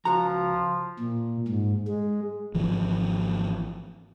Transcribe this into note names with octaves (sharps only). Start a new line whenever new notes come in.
C#2 F3 F#4 A#5
A#2
G#2
G#3
G#1 E3 F3